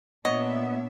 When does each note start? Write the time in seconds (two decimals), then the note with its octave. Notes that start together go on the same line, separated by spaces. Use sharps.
0.25 A#2 B3 D4 C#5 D#5 E5